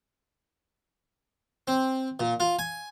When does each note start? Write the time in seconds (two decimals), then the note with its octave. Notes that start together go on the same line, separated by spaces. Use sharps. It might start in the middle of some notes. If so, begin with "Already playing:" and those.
1.68 C4
2.20 A#2
2.40 F4
2.59 G#5